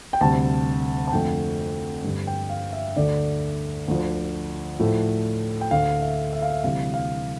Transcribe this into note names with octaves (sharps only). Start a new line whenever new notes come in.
G5
D2 C3 G3 A5
A5
F2 D3 F3 A3 G5
G2 D3 G3
G5
F5
E5
D2 D3 A3 D5
D2 D3 F3
A2 F3 A3
G5
D2 D3 A3 F5
E5
E5
F5
E5
D2 C3 E3 G3 F5
F5